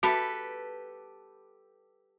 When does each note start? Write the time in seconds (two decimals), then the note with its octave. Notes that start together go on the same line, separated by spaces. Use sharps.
0.03 F#4 G4 A4 B4 A5 B5